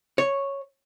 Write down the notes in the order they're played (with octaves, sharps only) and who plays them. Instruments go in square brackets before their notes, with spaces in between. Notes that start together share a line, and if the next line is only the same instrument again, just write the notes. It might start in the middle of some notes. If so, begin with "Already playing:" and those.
[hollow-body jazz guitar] C#5